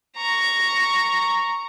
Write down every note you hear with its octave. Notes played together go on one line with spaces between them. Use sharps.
A#5 C#6